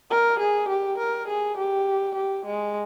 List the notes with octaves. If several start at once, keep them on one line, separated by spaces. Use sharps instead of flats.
A#4
G#4
G4
A#4
G#4
G4
G4
G#3